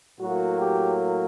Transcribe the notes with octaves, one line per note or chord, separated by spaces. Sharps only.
A2 F#3 A#3 F#4
G4